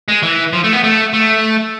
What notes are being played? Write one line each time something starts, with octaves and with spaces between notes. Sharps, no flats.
G#3
E3
F3
A3
B3
A3
A3